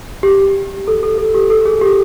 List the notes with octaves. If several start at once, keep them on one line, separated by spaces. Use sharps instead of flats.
G4
A4
A4
A4
G4
A4
G#4
G4